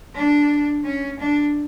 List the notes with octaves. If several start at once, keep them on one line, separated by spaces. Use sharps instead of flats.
D4
C#4
D4